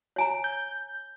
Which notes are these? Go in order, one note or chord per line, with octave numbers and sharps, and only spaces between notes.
C#5 G#5 A#5
G6